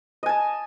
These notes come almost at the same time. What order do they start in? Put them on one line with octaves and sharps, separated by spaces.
D#5 G#5 A5